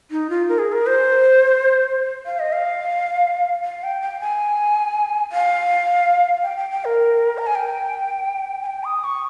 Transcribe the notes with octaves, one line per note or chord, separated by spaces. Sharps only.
D#4
F4
A#4
G#4
A#4
C5
F5
D#5
F5
F5
G5
G5
G#5
F5
G5
G5
G5
A#4
A#5
G#5
G5
G#5
G5
D#6
C#6